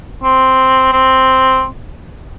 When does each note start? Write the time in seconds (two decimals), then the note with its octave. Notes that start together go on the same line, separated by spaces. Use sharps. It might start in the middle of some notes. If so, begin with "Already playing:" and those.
0.23 C4
0.93 C4